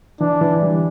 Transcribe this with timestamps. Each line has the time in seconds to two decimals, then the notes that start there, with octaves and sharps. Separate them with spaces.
0.21 E3 D4
0.41 E3
0.62 G3